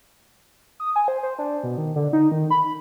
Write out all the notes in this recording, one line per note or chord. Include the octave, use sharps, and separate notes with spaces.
D#6
G#5
C5
C5
D4
B2
D#3
D3
D#4
D#3
B5